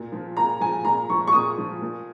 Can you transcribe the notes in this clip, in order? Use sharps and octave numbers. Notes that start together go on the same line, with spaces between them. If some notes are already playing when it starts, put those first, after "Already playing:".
Already playing: A#2
F3
A#2 A#5
F3 G#5
A#2 A#5
F3 C#6
C#6
A#2 D#6
F3
A#2